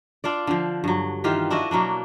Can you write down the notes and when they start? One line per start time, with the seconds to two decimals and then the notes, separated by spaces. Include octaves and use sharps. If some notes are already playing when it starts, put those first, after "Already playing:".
0.24 D4 F4 D5
0.47 D3 F3
0.84 G2 F#3
1.24 D#3 E3 F4 G4
1.50 D4 E4 F#4 D#5
1.71 B2 F#3 A#3 D4